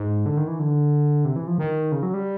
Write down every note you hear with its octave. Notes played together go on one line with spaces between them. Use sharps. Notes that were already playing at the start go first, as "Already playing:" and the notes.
Already playing: G#2
D3
D#3
E3
D3
C3
E3
F3
D#3
C#3
F#3
G3